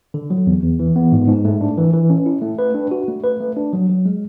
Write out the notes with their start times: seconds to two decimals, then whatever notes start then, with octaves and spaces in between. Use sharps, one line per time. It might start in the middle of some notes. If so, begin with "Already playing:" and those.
0.14 D3
0.30 F#3
0.47 E2
0.63 E2
0.79 E3
0.96 B3
1.12 G#2
1.28 G#2
1.45 A3
1.61 D4
1.78 E3
1.94 E3
2.10 C#4
2.26 E4
2.42 A3
2.59 B4
2.75 D4
2.91 F#4
3.08 A3
3.24 B4
3.40 A3
3.57 D4
3.73 F#3
3.89 F#3
4.06 G#3